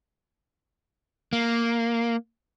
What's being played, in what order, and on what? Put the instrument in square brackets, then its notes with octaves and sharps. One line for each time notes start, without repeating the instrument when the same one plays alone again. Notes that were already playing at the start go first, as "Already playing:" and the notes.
[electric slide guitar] A#3